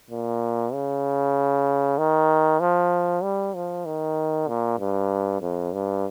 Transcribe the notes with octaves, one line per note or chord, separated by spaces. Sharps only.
A#2
C#3
D#3
F3
G3
F3
D#3
A#2
G2
F2
G2